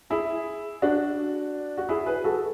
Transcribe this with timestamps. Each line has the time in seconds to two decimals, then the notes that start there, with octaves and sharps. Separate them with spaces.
0.10 E4 G#4
0.82 D4 F#4
1.77 F#4
1.89 E4 G#4
2.06 G#4 B4
2.24 F#4 A4